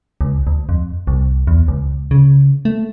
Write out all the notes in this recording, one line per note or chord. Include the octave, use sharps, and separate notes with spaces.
C#2
D2
F2
C2
E2
C#2
C#3
A3